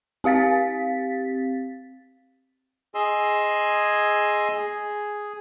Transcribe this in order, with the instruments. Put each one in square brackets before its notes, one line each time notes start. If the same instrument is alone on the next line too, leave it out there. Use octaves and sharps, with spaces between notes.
[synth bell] C4 G4 F5 A6 B6
[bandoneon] G#4 D#5 G#5 C6 E6
G#4